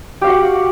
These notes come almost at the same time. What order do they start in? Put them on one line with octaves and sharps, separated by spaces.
G4 F5 F#4 F#5